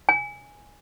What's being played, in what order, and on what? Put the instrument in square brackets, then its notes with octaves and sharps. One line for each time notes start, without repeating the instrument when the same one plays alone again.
[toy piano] G#5